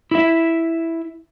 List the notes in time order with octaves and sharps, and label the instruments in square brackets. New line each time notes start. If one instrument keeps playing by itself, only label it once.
[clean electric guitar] E4 E5